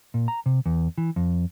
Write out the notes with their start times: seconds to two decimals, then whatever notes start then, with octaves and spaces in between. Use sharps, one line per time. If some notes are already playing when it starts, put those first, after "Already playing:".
0.14 A#2
0.28 A#5
0.46 C3
0.66 E2
0.98 E3
1.16 F2